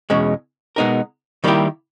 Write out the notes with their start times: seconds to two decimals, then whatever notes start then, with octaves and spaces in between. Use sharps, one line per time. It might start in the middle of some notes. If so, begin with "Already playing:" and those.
0.10 E2 B2 G#3 C#4
0.76 B2 G#3 B3 D#4 A#4
1.44 D#3 G3 A#3 E4 G4